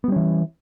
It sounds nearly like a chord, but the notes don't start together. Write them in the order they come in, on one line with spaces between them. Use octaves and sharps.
B3 G3 C#4 E3